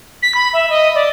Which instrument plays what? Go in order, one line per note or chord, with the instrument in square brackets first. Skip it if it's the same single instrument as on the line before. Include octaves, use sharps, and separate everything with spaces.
[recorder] B6
B5
E5
D#5
D5